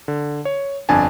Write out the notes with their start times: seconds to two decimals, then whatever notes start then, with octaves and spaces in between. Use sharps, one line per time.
0.08 D3
0.45 C#5
0.89 G1 F2 D4 G#5 A5